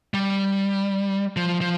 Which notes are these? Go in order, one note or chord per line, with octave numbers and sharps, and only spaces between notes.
G3
F3
F3